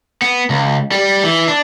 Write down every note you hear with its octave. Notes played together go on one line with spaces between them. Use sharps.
B3
C#2
G3
E3
D4